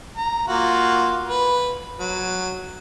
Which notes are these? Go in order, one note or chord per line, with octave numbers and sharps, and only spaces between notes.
A#5
A#3 F4 F#4
B4
F#3